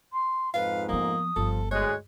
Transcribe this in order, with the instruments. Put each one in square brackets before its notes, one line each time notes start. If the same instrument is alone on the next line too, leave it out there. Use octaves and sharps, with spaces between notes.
[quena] C6
[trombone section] F2 G#2 [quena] B4 [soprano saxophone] F5
[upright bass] F3 B3 [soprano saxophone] A#3 [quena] D#6
[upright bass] G1 [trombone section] F3 [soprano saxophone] A4
[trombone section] D2 G#3 [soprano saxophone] C#5 [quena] F#6